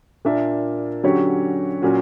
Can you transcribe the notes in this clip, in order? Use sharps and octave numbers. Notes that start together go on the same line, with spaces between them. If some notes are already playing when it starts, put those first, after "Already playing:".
A#2 A#3 D4 A#4 E5
D3 F#3 C#4 G4 C#5
A#2 F#3 C#4 F#4